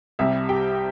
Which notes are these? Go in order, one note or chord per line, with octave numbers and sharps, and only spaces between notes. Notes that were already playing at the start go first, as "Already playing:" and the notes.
C2 C3 G3 E5
G4 G5